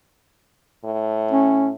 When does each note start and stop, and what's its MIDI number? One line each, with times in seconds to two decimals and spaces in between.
0.85 1.76 45
1.31 1.69 61